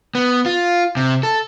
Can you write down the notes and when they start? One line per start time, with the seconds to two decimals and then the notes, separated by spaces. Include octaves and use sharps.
0.15 B3
0.46 F4
0.97 C3
1.23 A4